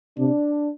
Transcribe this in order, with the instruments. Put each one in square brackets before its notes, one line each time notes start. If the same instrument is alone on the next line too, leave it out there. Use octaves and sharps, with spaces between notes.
[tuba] C3 [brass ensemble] D4